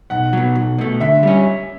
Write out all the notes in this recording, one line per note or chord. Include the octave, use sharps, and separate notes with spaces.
B1 F#5
B2 F#3
B1
B2 A3
D3 E5
G3 C#4